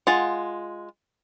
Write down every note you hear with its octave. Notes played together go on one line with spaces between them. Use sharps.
G#3 F4 F#5